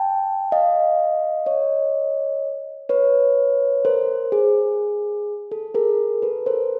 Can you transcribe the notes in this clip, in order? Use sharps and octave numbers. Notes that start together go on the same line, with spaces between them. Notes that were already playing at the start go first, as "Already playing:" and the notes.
Already playing: G5 A5
D#5 F5
C#5 D#5
B4 C#5
A#4 C5
G#4
A4
G#4 A#4
A4 B4
A#4 C5